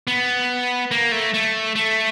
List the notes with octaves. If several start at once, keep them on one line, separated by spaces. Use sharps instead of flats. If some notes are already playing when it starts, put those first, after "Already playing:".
B3
A#3
A3
A3
A3